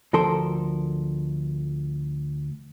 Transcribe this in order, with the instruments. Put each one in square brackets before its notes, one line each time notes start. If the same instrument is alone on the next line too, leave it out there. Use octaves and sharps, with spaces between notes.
[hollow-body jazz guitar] D2 F3 A4 A#4 C6